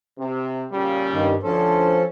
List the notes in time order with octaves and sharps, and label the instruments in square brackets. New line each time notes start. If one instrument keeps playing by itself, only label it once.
[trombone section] C3
A#2 C#3 G3
[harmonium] G2 D#3
[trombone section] D2 C5 [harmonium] F3 C#4 A4